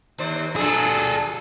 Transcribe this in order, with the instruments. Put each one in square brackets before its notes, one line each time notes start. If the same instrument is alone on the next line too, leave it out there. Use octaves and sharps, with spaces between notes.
[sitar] D#2 C5 D5
[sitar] F#3 D4 F4 [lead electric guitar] G#4 A4